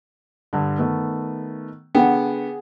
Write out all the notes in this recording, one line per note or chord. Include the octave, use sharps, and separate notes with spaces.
G2 D3
D#3 A3 B3
D3 B3 G#4 F#5 G5